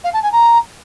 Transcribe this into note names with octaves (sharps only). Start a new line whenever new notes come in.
F5
A5
G#5
A#5